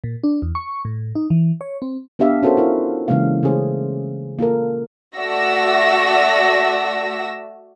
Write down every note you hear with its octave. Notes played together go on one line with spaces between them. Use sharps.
A#2
D4
E2
C#6
A2
D#4
E3
C#5
C4
B3 D4 G4 E5 F5
C#4 F#4 A4 A#4 C5
E4 F4 A#4
C#3 E3 G#3 A#3 F5
C#3 A3 C#4 G#4 C5
A#3 F4 A4 A#4
A3 F#4 D5 E5 E6 A#6